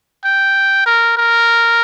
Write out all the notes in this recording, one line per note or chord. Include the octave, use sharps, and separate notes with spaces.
G5
A#4
A#4